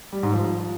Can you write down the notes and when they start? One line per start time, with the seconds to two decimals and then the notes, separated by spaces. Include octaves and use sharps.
0.13 G3
0.23 G#2
0.33 F3